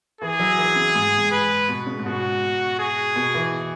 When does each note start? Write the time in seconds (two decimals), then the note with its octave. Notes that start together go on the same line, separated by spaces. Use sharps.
0.21 E3 G#4
0.39 F#3
0.58 E3
0.76 C#3
0.95 G#2
1.18 G#2
1.32 B4
1.68 B2
1.86 C#3
1.99 G#2
2.05 B2 F#4
2.79 G#4
3.16 B2
3.34 E3